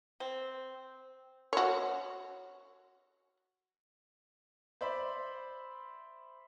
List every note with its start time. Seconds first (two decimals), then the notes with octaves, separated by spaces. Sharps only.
0.20 C4
1.53 F#4 C#5
4.81 C5 D5 E5 B5